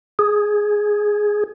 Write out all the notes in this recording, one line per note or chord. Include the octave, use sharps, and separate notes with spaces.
G#4